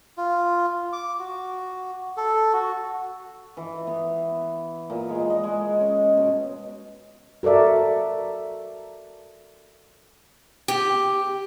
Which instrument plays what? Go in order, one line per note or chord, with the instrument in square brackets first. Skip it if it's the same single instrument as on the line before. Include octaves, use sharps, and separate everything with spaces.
[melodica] F4
D6
F#4
A4
F#4
[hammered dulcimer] E3
B3
A#2
G#3
D#5
G#3
C#4
B2
[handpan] F#4 A4 A#4 D5 E5
[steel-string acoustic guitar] G4